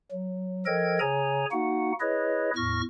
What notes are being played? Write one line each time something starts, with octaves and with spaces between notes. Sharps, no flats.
F#3
F3 A4 A#4 D#5 G5 G#6
C#3 G#4 C#5 G#5 A#5
A#3 D#4 F#4 F#5
E4 G#4 B4 C#5 D#5
E2 A2 C#6 F6 A#6